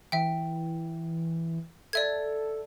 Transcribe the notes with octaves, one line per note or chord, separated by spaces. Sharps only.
E3 E5 G5
A4 D5 E5 G#6